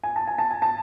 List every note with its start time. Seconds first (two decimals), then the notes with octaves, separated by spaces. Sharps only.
0.03 G#5
0.16 A5
0.27 G#5
0.38 A5
0.51 G#5
0.62 A5